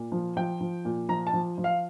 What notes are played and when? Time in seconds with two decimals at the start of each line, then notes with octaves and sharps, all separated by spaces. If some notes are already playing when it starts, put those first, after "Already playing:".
Already playing: A#2
0.12 F3
0.37 F3 G5
0.61 F3
0.85 A#2
1.09 F3 A#5
1.27 A5
1.33 F3
1.58 F3
1.64 F5